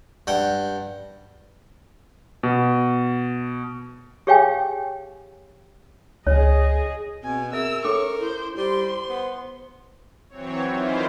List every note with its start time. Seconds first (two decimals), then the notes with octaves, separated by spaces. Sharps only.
0.27 G2 F#5 G5
2.43 B2
4.27 G4 G#4 C#5 F5 G5 G#5
6.27 C#2 G#4 C#5 D#5
7.23 B2 C4 G#5
7.53 G#4 A#4 E5 E6
7.85 C#4 A4 C#5 C#6 D6
8.20 E4 C5
8.57 G3 C5 C6
9.09 B3
10.29 E3 F#3 C4 C#5
10.70 D#3 E3 E4 F4 C5